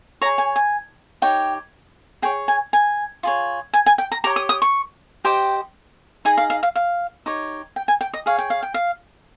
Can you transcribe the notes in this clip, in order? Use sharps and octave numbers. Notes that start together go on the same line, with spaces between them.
G#4 C#5 A#5
G#5
G#5
D#4 G4 C#5 G5
G#4 C#5 G5
G#5
G#5
F4 G#4 C#5
G#5
G#5
G5
A#5
G4 C#5 A#5
D#6
D#6
C#6
G4 C5 D#5 G5
D#4 G#4 D#5 G#5
F5
F5
F5
F5
D#4 G4 C#5
G5
G#5
G5
D#5
G#4 C#5 F5
G5
F5
G5
F5